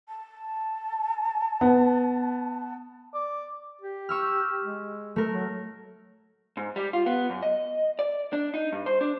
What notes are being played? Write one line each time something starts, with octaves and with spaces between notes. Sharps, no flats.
A5
B3
D5
G4
C#6 E6 F6
G#3
A3 A#4
F#3
G#2
G3
F4
B3
F#2
D#5
D5
D4
D#4
G2
C5
D4